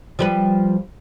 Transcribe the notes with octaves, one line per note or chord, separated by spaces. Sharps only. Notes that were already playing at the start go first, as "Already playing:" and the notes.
F3 G3 B4